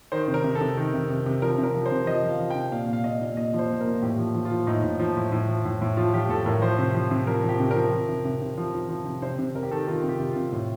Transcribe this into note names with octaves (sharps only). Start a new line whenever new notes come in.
D#3 C5
C3
A#4
C3
A4
C3
D#3
C3
C3
C3
F3 A#4
C3 A#4
F3
C5
C3
F3 D#5
F3
F5
F3
G5
C3
A#2 F5
A#2 F5
A#2 D#5
A#2
A#2 D#5
F3
C5
A#2
A#4
A#2
A2 G4
F3
F3
F4
F3
A2 D#4
A2
F3
A2
A2
F3
A2
A2
F3 F4
F3 G4
A2 A4
A2 A#4
F3 C5
C3
F3
C3
F3 A#4
F3
G4
C3
F3 A#4
F3
C3
C3
C3
F3
F3
F3
C3
C3 C5
C3
C3 A#4
G4
D#3 A4
D#3 F4
C3
G4
C3
F4
C3
A2